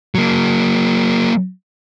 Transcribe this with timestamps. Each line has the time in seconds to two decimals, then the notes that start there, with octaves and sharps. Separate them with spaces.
0.15 F#3 A#3